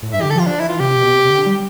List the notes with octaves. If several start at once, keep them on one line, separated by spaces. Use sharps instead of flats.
A2
G2 E5
E3 G4
D3
A4
F3
F4
F3 D4
E3 E4
F4
C3 G4
B2
C3
C3
D3
G3